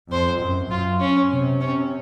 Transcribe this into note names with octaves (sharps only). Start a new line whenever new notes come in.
F2 C5
F#2
F#2 F4
C#4
C3
C#4